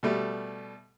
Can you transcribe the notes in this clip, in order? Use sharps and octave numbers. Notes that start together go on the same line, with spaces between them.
B2 G3 A3